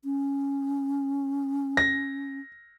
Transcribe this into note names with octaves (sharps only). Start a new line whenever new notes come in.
C#4
A#6